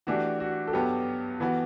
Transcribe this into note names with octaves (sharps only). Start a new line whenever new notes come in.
E3 A3 D4 F#4 G4
F#4
A4
G2 F#3 B3 G4
E3 B3 F#4